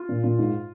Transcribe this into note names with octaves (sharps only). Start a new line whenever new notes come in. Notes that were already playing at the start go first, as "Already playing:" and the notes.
Already playing: F4
A#2
A#2
G#2